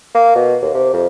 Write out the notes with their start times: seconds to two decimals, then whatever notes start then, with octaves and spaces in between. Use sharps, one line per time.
0.14 A#3
0.35 B2
0.62 D#2
0.74 C3
0.93 F2